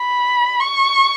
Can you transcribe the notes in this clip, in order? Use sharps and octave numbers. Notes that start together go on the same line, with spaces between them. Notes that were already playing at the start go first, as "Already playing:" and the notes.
Already playing: B5
C#6